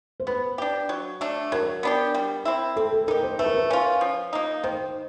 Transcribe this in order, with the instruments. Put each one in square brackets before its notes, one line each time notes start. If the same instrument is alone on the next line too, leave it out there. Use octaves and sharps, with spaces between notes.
[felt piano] C5
[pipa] B3 [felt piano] B4
[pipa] D4 G4
F#3
A3 D4
[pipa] F#3 [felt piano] A#4
[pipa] B3 D4 G4
G3
C4 E4
[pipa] C4 [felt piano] A4
[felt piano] A4
[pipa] D#4 G4 [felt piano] A#4
[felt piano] C5
[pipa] A3 [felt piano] B4
[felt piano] A#4
B4
[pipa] C#4 F4
F3
A#3 D#4
[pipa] D#3 [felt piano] C5